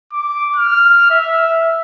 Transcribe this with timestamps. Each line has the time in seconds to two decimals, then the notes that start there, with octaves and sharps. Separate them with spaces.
0.13 D6
0.56 F6
1.10 E5